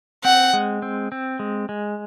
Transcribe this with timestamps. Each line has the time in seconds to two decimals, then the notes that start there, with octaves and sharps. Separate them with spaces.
0.24 C4 F#5
0.53 G#3
0.82 C4
1.12 C4
1.39 G#3
1.69 G#3